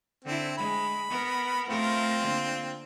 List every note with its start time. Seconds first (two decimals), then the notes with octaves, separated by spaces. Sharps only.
0.25 D3 C4 E4
0.58 G#3 B5
1.10 B3 A#4
1.69 A3 C4 F4 A#4
2.20 D3 A#3